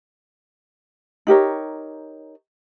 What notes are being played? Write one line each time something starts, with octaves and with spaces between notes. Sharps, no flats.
D#4 G4 A#4 C#5